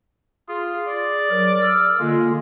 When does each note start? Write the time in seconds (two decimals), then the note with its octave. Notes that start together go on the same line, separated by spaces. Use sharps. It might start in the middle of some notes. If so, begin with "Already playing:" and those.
0.49 F4 G#4
0.87 D5
1.30 F#3 A#4
1.62 E6 F6
2.00 D3 G#3 A#3 F4